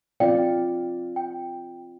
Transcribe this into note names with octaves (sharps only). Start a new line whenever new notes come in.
C4 F4 D5 F5 G5
G5